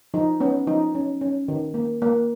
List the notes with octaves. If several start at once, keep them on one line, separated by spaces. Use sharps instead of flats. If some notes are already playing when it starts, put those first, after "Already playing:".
F3 D#4
B3 C#4
F3 D#4
C#4
C#4
D#3
A#3
A#3